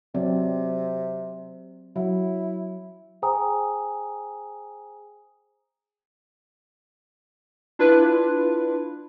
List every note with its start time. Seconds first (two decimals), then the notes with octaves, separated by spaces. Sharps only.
0.15 C3 F#3 C4 D5
1.96 F#3 E4
3.22 G#4 C5 G5 G#5 A#5 D#6
7.79 D4 E4 F4 B4